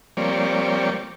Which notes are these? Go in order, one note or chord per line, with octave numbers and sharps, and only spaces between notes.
F3 G3 A#3 C4 C#5 D5